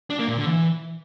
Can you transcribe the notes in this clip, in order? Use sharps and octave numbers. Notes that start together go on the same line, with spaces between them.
D4
A#3
A#2
D3
E3